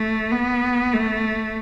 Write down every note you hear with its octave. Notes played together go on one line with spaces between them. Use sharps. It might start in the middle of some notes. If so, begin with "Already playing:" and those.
Already playing: A3
B3
A3